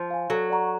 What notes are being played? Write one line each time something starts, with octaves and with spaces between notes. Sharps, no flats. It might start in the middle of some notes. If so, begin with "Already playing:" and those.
Already playing: F3 C5
F5 G#5
F#3 A4
D5 F#5 A#5 C#6